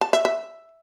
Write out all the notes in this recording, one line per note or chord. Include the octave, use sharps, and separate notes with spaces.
A5
E5
E5